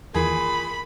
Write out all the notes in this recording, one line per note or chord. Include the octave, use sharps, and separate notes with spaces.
E2 A#2 D#3 E3 G#4 B5